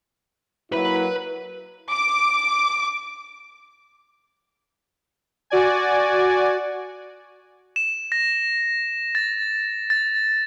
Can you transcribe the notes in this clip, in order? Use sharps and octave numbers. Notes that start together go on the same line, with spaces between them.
F#3 A#3 E4 B4 B5
D6
F#4 D5 G#5
E7
A#6
A6
A6